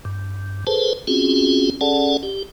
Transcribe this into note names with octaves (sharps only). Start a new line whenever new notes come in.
G2
G#4 A4 B4 C5 A5
C4 C#4 F4 F#4 G#4
C#4 G#4 A4 D5 F#5 A5
G4